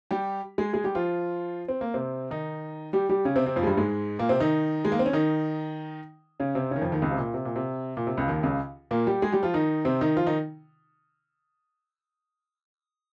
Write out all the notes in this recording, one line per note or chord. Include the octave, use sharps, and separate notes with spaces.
G3 G4
G#3 G#4
G#3 G#4
G3 G4
F3 F4
C4
A#3
C3 C4
D#3 D#4
G3 G4
G3 G4
C#3 C#4
C3 C4
C3 C4
F2 F3
G#3
G2 G3
G#2 G#3
A#2 A#3
C3 C4
D#3 D#4
G#3
A#3
C4
C#4
D#3 D#4
C#3 C#4
C3 C4
C#3 C#4
D#3
F2 F3
D#2 D#3
C#2 C#3
C3
A#2
C3
A#2
C3
A#2
C3
C#2 C#3
D#2 D#3
C#2 C#3
A#2 A#3
G3 G4
G#3 G#4
G3 G4
F3 F4
D#3 D#4
C3 C4
D#3 D#4
F3 F4
D#3 D#4